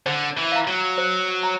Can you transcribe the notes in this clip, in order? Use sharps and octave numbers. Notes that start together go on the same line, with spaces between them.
D3 C5
E3
F5 A#5
F#3
C5
A#5